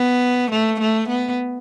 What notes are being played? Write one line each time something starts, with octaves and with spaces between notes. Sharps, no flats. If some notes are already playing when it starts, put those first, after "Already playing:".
Already playing: B3
A3
A3
B3